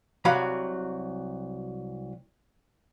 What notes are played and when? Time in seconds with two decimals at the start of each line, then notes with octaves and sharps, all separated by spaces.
0.25 C2 F#3 F#4 F5 B5